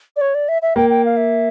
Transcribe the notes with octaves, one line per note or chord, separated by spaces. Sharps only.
D5
C#5
D5
E5
E5
A#3 G5
G5
F5
E5